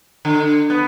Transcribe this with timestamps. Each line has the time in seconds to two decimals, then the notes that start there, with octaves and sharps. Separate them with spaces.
0.25 D3
0.70 B3